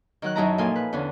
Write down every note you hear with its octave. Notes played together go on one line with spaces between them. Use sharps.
D#3 F#3 F#6
F#2 F#3 D#4 E4 A5 A#5
A#2 F3 A4 F5 G#5 C6
B4
E2 D3 C#4